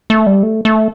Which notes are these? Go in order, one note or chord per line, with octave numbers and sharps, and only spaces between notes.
A3
G3
A3
A3